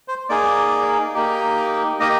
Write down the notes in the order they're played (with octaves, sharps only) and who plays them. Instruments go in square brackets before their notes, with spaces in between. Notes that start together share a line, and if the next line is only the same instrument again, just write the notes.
[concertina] C5
A#3 D#4 G#4 D5
A#3 D#4 G4
A#3 D#4 G4 D#5